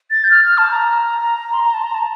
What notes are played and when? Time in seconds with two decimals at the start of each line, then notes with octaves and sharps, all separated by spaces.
0.11 A6
0.24 G6
0.31 F6
0.45 F6
0.58 A5
0.71 A#5
1.53 C6
1.63 A#5
1.74 A5
1.84 A#5
1.94 A5